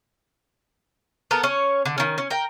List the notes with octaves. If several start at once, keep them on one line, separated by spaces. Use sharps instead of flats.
B3 A4 A#4
C#4 C#5
D3
D#3 C#4
C#4
A#4 G5